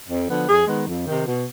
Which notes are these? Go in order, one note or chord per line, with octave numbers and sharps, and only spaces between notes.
F2
D3 F3 B3
F2 G#4
D#3 G#3 B3
F2
C3 D#3
B2